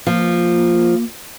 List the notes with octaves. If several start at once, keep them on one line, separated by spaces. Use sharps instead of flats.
F3 A#3